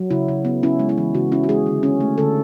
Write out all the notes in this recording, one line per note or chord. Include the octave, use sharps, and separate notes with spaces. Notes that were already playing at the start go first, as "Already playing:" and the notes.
Already playing: F#3
C#3 E4
C#3
B3
C#4 E4
G#3
E4
E3
C#3 F#4
C#4 E4
F#4
G#3 G#4
D3
C#4
A3
D3 A4